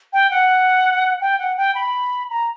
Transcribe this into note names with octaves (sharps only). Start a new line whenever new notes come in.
G5
F#5
G5
F#5
G5
B5
A#5